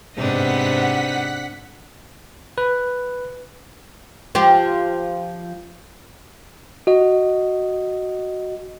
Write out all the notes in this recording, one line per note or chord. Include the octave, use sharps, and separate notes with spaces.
G#2 C3 B3 D4 D#4 F#5 B6
B4
F3 G4
F#4 D#5